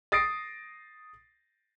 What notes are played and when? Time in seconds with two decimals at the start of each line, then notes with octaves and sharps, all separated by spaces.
0.12 D#6 A6 A#6 C7 D7